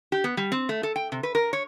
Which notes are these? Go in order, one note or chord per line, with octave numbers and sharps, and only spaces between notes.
G4
B3
G3
C4
A3
A4
G5
C3
B4
A#4
C#5